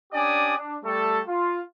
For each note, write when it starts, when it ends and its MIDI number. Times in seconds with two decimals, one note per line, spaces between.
0.13 0.56 61
0.13 0.56 62
0.13 0.56 67
0.13 0.56 74
0.13 0.56 80
0.13 0.56 87
0.56 0.75 62
0.84 1.21 55
0.84 1.21 57
0.84 1.21 69
1.28 1.60 65